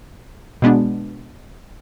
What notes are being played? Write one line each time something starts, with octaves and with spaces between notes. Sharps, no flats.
B2 G#3 B3 D4